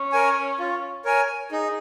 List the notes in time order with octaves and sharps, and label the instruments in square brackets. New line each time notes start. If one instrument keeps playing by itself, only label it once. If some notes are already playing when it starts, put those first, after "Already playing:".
Already playing: [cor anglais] C#4
[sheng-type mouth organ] A#4 C#5 G#5
F4
A#4 C#5 G#5
[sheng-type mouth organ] D#4 [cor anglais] G#4